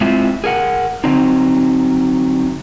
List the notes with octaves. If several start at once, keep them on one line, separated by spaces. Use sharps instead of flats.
G#3 C4 E4 F4
G#4 A#4 F#5
D3 F#3 C4 D#4